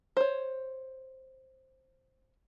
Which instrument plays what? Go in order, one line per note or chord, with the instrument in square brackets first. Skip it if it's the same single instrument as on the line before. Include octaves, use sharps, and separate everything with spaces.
[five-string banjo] C5 C#5